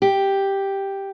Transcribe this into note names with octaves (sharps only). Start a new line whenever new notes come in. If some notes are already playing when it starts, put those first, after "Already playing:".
G4